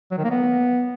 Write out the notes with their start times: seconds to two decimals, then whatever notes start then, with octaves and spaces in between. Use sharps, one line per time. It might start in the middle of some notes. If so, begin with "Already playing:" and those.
0.12 F#3
0.18 D#3
0.24 A#3
0.30 B3